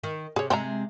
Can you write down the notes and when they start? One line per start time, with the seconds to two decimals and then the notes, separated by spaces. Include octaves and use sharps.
0.04 D#3
0.36 C3 G#4 C#5
0.50 C3 G#3 C4 E5 A#5